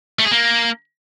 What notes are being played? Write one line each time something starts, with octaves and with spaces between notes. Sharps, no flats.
A3
G#4
A#3